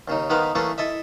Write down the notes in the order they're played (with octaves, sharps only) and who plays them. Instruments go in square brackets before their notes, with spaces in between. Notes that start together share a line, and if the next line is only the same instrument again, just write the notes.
[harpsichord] D#2 C#3 D#4
D#3 B3 D#4 B4 C5 F5
E3 A3 A#3 C#4 G#4 A4
E4 A4 D#5 E5